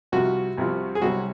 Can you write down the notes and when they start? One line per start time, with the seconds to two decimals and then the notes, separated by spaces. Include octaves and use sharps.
0.12 C2 C3 F3 F#4
0.58 C2 C3 F3
0.95 G#4
1.02 C2 C3 F#3 F#4